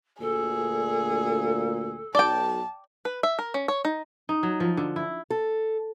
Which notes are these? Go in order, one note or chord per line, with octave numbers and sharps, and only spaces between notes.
D2 A#2 G#4 A4
B1 D5 G5 A5
B4
E5
A#4
C#4
C#5
D#4
D#4
F#3
F3
D3
E4
A4